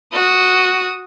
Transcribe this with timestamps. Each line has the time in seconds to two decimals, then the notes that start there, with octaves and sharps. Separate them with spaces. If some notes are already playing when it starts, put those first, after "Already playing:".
0.13 F#4 D#6